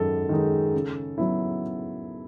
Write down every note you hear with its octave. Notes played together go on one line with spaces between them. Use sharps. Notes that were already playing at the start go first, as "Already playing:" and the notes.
Already playing: F#2 D#3 G#3 D#4 A4
D#3 G#3 D#4
C#3
F#3 B3 E4